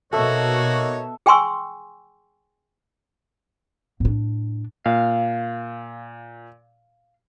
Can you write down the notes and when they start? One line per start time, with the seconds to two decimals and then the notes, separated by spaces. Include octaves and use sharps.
0.13 B2 A#3 D#4 F#4 A4 C#5 E5
1.26 G#4 G5 G#5 C6 C#6 E6
4.00 A2 D4
4.86 A#2 F5